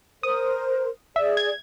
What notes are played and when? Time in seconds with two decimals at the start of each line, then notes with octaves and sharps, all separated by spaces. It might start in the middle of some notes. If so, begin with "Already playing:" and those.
0.23 A#4 C5 D#6
1.16 G#4 D5 E5
1.37 G#6